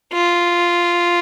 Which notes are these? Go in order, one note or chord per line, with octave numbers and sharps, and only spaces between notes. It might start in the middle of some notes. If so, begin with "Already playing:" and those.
F4